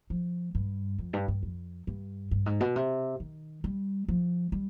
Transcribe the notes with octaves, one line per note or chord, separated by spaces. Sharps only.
F3
G2
F2
G2
G2
F2
G2
G2
G#2
B2
C3
D#3
G3
F3
G3